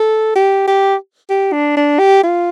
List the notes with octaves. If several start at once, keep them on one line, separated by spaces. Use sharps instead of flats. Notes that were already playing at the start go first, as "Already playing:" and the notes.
Already playing: A4
G4
G4
G4
D4
D4
G4
F4